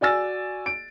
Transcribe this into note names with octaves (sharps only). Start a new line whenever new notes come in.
F#4 D5 G#5 E6 A6
D7